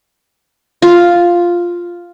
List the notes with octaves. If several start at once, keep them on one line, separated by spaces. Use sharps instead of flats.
F4